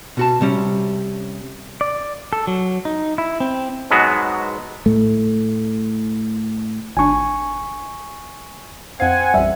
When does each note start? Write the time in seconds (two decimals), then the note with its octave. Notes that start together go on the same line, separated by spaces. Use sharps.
0.17 B2 F#4 A5
0.41 C3 G3 C#4
1.81 D5
2.33 A4
2.47 F#3
2.85 D#4
3.18 E4
3.40 C4
3.91 G#2 B2 F#3 G#3 B3 F#4
4.86 A2 A3
6.97 G#1 D4 G#5 C#6
9.00 F2 C4 F5 F#5 G#5
9.34 A1 F2 G3 E5